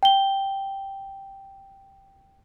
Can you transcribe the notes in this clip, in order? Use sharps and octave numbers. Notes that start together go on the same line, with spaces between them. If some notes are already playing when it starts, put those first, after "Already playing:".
G5 G7